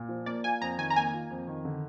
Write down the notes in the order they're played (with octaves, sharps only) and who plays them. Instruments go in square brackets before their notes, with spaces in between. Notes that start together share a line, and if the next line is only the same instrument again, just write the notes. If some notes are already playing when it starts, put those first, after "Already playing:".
Already playing: [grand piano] A#2
F3
[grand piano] A#3 [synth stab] D5
[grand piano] F4 [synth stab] G#5
[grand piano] F2 [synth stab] A#5
[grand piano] D#3 [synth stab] G#5
[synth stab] A#5
[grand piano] A#3 [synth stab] G#5
[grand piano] F4
F2
D#3
D3